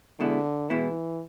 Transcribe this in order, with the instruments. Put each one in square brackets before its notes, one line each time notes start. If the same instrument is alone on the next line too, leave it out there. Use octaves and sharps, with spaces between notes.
[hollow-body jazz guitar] B2 G#3 B3 E4 [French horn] D3
[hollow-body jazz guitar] B2 G#3 B3 E4 [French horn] E3